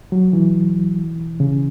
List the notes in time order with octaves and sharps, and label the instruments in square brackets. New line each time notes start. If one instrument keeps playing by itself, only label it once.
[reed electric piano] F#3
E3
C#3